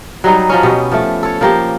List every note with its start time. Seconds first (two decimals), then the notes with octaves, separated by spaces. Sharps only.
0.24 F#3 G3 D#4
0.49 F3 F#3 C#4
0.63 B2 B3 G4
0.92 F3 A3
1.23 A4 C#5
1.41 F3 A#3 G4